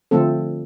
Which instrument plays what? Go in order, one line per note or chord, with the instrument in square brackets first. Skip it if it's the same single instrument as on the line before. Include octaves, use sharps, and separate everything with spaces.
[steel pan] D3 F3 A3 C4 A4